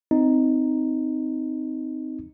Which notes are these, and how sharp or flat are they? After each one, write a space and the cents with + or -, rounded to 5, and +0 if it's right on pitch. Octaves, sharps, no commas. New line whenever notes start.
C4 -10 D#4 +0